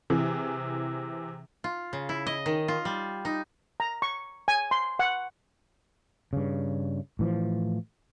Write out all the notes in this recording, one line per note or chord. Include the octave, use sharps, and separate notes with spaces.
C3 E3 G#4
F4
C#3
E4
D#5
D#3
F4
G3
D#4
A#5
C#6
G#5
C6
F#5
G2 C#3
A2 E3 F3